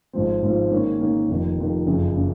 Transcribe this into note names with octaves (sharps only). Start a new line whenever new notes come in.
G#1 G#2 F3 C4
G#1 G#2 F3 C4
G#2 D#3 A#3 C#4
G#2 D#3 A#3 C#4
F1 F2 D#3
F1 F2 D#3
F#1 F2 C#3
C#3